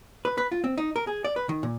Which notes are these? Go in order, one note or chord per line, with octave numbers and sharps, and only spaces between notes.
B4
B4
F4
C4
D#4
A#4
G#4
D5
B4
D#3
A#2